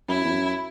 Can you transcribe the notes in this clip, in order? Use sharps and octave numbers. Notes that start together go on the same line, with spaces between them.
F#2 E4
E2
F#2